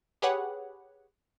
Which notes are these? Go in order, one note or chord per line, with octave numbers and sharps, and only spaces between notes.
G4 G#4 B4 C#5 F#5